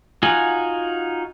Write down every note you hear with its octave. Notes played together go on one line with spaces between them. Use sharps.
D#4 F4 F#4 F#5 G#5